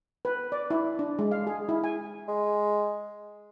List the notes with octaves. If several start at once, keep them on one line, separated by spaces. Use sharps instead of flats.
B4
D5
E4
D4
G#3
F5
G#4
E4
G#5
G#3